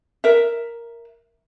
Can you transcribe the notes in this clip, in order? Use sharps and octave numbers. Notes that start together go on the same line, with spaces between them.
A#4 E5